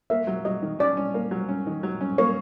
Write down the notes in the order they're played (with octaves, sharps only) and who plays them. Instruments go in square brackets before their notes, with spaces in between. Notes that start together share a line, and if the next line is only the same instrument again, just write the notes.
[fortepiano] A#3 [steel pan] E5
[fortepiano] F#3
[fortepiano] F#3 [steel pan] D#5
[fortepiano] D#3
[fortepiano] C#4 [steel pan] D5
[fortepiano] C#4
A#3
F#3
C#4
D#3
F#3
C#4
[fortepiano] A#3 [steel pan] C#5